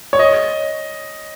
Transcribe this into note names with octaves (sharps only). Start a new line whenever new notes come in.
C#5
D#5